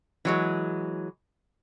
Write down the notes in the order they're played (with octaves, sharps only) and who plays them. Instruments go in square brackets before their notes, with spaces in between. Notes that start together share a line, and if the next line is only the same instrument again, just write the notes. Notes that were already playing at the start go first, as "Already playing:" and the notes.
[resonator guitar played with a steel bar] E3 F#3 G#3